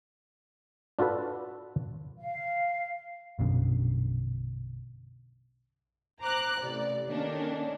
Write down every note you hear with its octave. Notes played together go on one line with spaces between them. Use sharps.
D4 F4 F#4 A4 B4
F5
A#1 F#2 B2 D3
C5 A#5 D6 F#6
A1 C3 D5
D#3 A3 A#3 C#4 D4